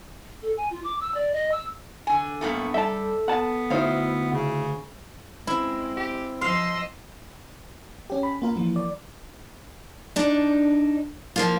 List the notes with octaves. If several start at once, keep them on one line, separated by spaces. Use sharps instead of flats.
A4
G#5
F4
D6
E6
D5
D#5
E6
D3 G#5
G2 A#2 A3 B3
G3 A4 E5 G5 A5
B3 F#5 A5
D2 D#4 E4 C5 F5
C#3
G#3 C4 E4
G4
F3 D#5 F5 C6 E6
C#4 G4
B5
A#3 F4 A#4
E3 F3 A#3
D5
D4 D#4
F3 A#3 F4